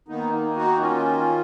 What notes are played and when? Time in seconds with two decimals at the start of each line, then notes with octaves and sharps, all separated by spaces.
0.08 D#3 A#3 B3 D#4
0.57 D#4 F#4
0.80 C#4 F4